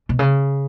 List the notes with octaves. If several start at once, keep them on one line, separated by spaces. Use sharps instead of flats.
B2
C#3